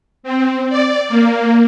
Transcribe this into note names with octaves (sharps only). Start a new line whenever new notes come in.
C4
D5
A#3